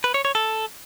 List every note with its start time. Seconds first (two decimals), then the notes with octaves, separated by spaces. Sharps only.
0.04 B4
0.14 C#5
0.25 C#5
0.35 A4